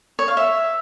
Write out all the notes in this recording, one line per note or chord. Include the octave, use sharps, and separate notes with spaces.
C#5
F5
E5